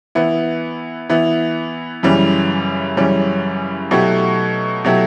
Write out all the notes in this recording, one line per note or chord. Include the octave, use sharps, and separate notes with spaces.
E3 B3 E4
E3 B3 E4
F#2 C#3 E3 G3 C#4
F#2 C#3 E3 G3 C#4
B2 F#3 A3 E4 G4
B2 F#3 A3 E4 G4